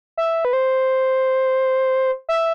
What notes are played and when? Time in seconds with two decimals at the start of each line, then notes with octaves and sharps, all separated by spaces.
0.17 E5
0.45 B4
0.53 C5
2.29 E5